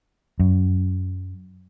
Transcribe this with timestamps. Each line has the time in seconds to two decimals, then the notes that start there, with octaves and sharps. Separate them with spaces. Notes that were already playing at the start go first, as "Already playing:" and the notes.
0.40 F#2